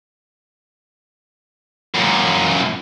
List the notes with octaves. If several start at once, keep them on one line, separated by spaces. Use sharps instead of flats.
F#2 A#2